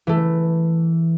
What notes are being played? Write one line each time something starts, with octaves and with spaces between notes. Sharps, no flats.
E3 A3